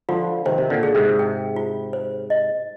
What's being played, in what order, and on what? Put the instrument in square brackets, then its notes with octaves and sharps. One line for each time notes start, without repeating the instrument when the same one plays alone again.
[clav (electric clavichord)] D3 F3 [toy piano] F4
[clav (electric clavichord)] C3 D#3 [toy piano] C5
[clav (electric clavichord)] C3
A#2 D3
[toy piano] G#4
[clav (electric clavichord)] G#2 C3
[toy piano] G5
F4
C5
D#5